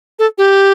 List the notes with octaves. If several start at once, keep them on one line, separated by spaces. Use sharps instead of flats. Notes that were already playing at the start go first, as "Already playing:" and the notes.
A4
G4